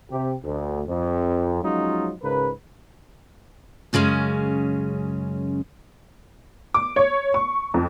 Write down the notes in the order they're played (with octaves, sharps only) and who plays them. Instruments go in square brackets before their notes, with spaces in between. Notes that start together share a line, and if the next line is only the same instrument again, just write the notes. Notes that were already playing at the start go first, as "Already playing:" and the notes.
[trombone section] C3 G4
D2
F2
F3 F#3 G#3 C#4 D#4 F4
C#2 G#2 C#3 A#4 B4
[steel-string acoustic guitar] F#2 C#3 G#3 C#4
[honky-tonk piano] D6
C#5
C#6
F2